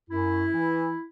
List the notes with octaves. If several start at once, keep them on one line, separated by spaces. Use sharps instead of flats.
F#2 E4
E3